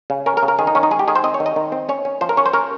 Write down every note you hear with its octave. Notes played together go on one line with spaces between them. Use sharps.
C#3
C#4 A#4
A#4
C#3
A#4
D#3 G#4
D#4
D#3 C#4
D#4
G#3 G#4
G4
D#3 G#4
C5
C4 D#5
C#5
D#3
D#5
D#3
C4
C#4 C#5
C#4
F3 C5
A#4
C#4 C#5
C5
C#4 A#4